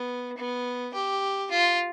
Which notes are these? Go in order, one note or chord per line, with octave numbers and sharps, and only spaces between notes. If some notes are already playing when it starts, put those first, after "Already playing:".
Already playing: B3
B3
G4
F4